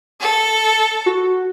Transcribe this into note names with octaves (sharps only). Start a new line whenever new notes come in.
A4
F#4